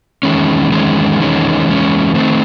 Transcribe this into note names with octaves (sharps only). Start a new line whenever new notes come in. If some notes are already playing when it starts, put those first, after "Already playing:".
E2 D#3 G#3 C#4
E2 D#3 G#3 C#4
E2 D#3 G#3 C#4
E2 D#3 G#3 C#4
D#3 A3 C4